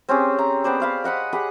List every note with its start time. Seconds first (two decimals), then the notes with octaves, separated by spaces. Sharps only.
0.09 C4 C#4 G4 G#4
0.39 A#5
0.64 B3 C4 C5 D5
0.80 C5 F5 B5
1.04 D#5 F#5 B5 D#6
1.33 G4 G#4 F#5 B5